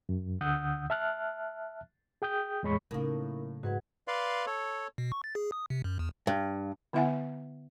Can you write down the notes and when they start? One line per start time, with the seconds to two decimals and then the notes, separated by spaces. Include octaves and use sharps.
0.09 F#2
0.41 D2 D3 F#5 D#6 E6 G6
0.90 E5 A5 F6 F#6
2.22 G#4 G5 D#6 G6
2.63 E2 A2 G#3 C#5 B5 C#6
2.91 A2 C#3 F#3 A#3 C#4 D#4 A#4
3.63 G#2 F#4 B4 F#5 G#6
4.08 B4 D5 F5 C6
4.46 A4 C#5
4.98 B2
5.12 C#6
5.24 A6
5.35 G#4
5.52 D#6
5.70 C3
5.84 F#2
5.99 E2
6.27 G2
6.93 D3 B3 E4 E5 F#5 G#5